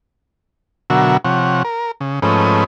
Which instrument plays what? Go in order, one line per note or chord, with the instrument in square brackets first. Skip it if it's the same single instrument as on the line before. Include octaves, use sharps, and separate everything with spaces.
[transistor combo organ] B2 D3 F#3 F#4 A#4 E5
C3 F3 C#5 F#5
A#4
C#3
G#2 F3 A3 C#4 B4 D#5